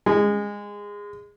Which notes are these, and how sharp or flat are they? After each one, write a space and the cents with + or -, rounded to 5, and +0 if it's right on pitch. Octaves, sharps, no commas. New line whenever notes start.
G#3 -20